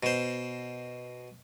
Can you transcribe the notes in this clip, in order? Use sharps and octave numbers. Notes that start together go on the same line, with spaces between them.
B2 C5